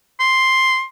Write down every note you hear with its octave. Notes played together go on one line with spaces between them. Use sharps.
C6